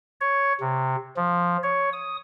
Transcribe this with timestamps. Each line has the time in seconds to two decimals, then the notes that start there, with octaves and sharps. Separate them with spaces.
0.21 C#5
0.60 C3
1.17 F3
1.63 C#5
1.93 D#6